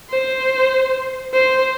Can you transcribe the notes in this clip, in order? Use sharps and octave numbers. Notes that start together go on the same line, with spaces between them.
C5
C5